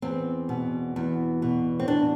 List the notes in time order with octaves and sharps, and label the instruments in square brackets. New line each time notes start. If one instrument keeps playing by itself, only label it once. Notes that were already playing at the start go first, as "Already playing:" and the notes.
[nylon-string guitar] E2 C4
B2
E2
B2
C4
E2 D4